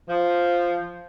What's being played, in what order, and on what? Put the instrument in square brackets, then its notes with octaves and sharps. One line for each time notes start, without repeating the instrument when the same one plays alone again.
[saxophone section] F3